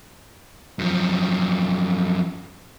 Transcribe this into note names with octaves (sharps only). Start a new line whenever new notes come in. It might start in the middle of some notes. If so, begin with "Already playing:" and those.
F#2 F3